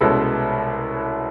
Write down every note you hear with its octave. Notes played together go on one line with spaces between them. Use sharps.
C2 B2 G#3 C#4 A4 B4